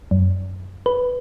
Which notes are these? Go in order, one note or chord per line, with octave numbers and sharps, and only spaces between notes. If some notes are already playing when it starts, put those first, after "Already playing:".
F#2
B4